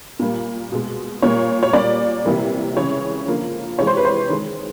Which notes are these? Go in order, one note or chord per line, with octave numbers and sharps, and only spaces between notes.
A#2 G3 A#3
B2 G#3
A#2 G3 A#3 C#5
C#5
A#2 G3 A#3 D5
C3 E3 G3 A#3
C#3 E3 G#3 C#5
D3 F3 A#3
C3 E3 G#3 C#5
C5
B4
C5
D#3 G#3